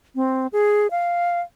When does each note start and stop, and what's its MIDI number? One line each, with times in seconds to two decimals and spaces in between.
0.15 0.47 60
0.53 0.87 68
0.91 1.40 77